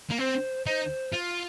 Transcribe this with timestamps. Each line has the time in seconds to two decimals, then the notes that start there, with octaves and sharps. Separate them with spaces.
0.11 A#3
0.18 C4 C5
0.66 D#4 C5
1.14 F4